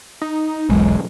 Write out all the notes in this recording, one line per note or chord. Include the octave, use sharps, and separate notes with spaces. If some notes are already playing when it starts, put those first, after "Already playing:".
D#4
E1 B1 G#3